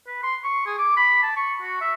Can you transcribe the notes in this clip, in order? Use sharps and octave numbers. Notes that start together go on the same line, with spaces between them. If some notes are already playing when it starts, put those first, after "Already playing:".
B4
C6
C#6
G#4
D6
B5
A5
C#6
F#4
E5